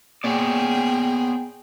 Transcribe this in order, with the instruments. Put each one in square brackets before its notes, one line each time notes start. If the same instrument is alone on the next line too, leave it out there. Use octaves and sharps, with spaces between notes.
[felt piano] A#2 [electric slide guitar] B3 C#5 D5 [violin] G#4 G5